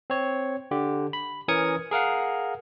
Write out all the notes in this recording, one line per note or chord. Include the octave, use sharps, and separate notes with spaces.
C4 C#5
D3 G4
B5
E3 C#4 A#4 D#6 G#6 C#7
G#4 A#4 F5 F#5